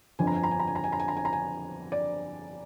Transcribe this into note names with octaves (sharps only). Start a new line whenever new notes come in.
G1 F2 D3 F3 G#5
A#5
G#5
A#5
G#5
A#5
G#5
A#5
G#5
A#5
G#5
A#5
G#5
A#5
G#5
D5